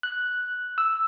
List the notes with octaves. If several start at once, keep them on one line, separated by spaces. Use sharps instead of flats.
F#6
E6